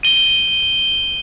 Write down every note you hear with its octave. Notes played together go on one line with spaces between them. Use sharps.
D#7 G7